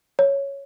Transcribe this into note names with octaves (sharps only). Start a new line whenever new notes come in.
C#5